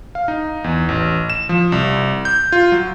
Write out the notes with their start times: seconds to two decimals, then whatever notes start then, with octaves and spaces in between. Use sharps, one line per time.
0.15 F5
0.28 D#4
0.64 E2
0.89 A1
1.30 E7
1.49 F3
1.72 C2
2.25 G6
2.52 F4
2.72 F#3